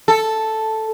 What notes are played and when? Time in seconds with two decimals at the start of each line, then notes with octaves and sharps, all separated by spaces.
0.08 A4